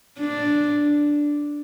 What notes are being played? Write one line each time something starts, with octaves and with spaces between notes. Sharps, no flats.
D4